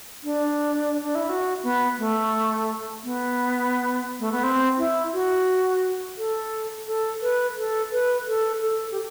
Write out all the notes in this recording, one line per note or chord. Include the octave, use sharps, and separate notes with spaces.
D4
D4
E4
F#4
B3
A3
B3
A3
B3
C4
E4
F#4
A4
A4
B4
A4
B4
A4
A4
G4